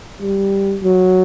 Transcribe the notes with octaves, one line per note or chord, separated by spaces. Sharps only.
G3
F#3